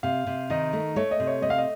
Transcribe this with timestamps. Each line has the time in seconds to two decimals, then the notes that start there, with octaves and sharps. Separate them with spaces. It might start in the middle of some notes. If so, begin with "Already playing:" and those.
0.03 C3 F5
0.27 C3
0.50 D#3 D#5
0.73 A3
0.96 A3 C#5
1.11 D#5
1.20 C3
1.27 C#5
1.42 A3 D#5
1.50 F5
1.58 D#5